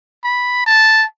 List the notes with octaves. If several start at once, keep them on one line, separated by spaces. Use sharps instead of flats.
B5
A5